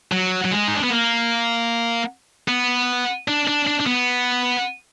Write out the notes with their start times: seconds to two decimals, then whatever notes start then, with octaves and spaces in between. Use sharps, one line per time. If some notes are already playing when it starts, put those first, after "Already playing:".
0.12 F#3
0.45 F#3
0.51 G#3
0.68 D#4
0.76 D4
0.83 B3
0.90 A#3
2.48 B3
3.28 D4
3.48 D4
3.67 D4
3.80 D4
3.86 B3